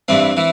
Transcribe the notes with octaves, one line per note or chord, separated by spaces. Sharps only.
G2 E3 C4
E3